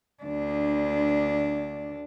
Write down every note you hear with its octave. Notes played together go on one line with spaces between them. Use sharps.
D2 D4